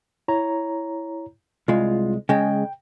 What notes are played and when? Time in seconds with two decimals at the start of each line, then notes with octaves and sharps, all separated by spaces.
0.28 E4 C#5 A#5
1.68 C2 G#3 F4
2.29 C#3 G#3 G5